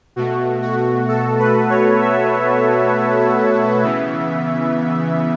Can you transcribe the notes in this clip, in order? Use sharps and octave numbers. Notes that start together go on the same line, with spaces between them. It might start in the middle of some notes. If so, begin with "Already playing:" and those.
B2 A3 F#4
F#4
A4
B4
C#5
E5
C#3 E3 B3